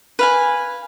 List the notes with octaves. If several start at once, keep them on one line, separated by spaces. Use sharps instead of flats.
B4 F5 G#5